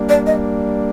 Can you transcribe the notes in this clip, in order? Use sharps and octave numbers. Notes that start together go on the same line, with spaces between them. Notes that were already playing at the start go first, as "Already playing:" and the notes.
Already playing: G3 A#3 D4
D5
D#5